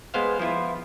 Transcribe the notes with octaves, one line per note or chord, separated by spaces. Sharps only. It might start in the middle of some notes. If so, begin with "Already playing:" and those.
G#3 B3 C5 F5
F3 B3 E4 F4